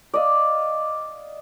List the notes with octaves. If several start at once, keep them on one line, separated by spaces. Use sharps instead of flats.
D5 D#5 F5